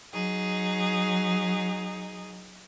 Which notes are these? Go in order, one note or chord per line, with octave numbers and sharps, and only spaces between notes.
F#3 D#4 G#4